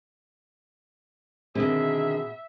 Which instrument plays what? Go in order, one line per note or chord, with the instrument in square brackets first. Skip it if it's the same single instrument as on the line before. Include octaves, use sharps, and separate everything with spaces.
[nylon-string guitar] B2 C4 [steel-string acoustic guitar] D3 D#3 [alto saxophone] G#4 [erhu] E5